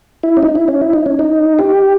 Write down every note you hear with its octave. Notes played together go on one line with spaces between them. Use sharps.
E4
C#4
D#4
E4
C#4
E4
D#4
C#4
D#4
G4